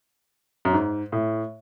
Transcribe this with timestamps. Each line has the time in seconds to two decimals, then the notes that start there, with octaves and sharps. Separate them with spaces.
0.65 F#2
0.73 G#2
1.12 A2